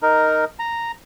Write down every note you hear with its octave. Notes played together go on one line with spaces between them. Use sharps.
D#4 A#4
A#5